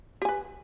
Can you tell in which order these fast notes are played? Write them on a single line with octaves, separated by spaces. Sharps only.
G4 G#5 B4